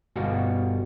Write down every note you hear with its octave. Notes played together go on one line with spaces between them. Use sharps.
G1 B2 G3 D#4 F#4 F5